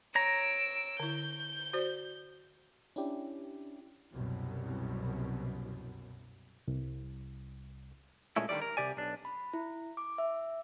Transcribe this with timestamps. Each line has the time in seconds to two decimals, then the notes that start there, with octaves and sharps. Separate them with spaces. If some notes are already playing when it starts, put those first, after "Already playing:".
0.15 C#5 A#5 E6 D7
1.00 D3 E4 G6
1.73 F#4 C5 D5
2.96 C#4 D4 E4 G4
4.13 C2 F#2 B2
6.68 C2
8.36 A#2 G#3 A3 C#4 E4
8.49 D3 D#3 F#3 G3 D5
8.62 A#4
8.77 C2 G#2 C3 G4 D5 G#5
8.97 B1 D4
9.25 B5
9.53 E4
9.97 D6
10.18 E5